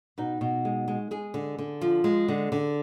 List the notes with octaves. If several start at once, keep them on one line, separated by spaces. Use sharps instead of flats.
B2 D#4
B2
G#3
G#3
G#3 G#4
D3
D3
F3
G#3
D3
D3